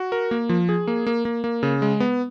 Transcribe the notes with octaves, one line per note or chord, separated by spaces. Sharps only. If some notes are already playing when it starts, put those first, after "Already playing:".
Already playing: F#4
A#4
A#3
F3
G#4
A#3
A#3
A#3
A#3
C#3
G#3
B3